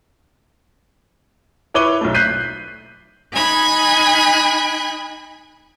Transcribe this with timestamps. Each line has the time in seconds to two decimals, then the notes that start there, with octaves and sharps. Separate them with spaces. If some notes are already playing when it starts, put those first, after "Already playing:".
1.74 E4 B4 C#5 D6 D#7 G7
2.01 B1 A3
2.14 F#6 G6 B6 C7 D#7
3.33 D#4 G#5 B5 F#6 G#6